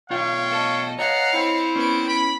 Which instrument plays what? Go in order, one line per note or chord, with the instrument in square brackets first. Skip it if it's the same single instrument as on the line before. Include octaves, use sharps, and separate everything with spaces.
[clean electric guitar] B1 F4 [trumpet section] C#5 F5 G5
[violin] A4 D#5
[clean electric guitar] C#5 D#5 [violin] F5 C#7 [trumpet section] F#5 [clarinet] A#5
[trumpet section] C4 [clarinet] E4
[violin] B3 D7 [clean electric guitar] C#4
[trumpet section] B5